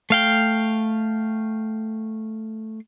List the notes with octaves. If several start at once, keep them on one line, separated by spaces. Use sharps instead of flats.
A3 F5 G5